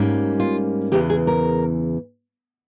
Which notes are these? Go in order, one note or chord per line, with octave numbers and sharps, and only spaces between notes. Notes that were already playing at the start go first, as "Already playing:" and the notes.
Already playing: G#2 G3 A#3 C#4
F4
E2 C#3 E3 G4
G#4
A#4